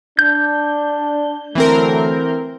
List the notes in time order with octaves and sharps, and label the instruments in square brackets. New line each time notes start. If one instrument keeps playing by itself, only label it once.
[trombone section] D4 [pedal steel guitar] G6
[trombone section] D3 F#3 A3 [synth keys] E3 C4 A#4